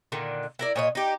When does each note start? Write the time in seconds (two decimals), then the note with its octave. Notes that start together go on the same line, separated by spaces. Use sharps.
0.12 A#2 D3 D#3
0.59 E4 A#4 D5
0.76 A#2 C#5 D#5
0.95 D#4 G4